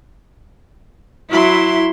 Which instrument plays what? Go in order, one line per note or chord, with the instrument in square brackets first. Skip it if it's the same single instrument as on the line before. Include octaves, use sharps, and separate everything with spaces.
[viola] F#3 C6 [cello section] E4